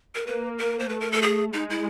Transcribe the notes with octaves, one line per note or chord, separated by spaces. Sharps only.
A#4
A#3 B4
A#4
C5
A3 B4
A#4
A4
G#4
G#3 D#4
E4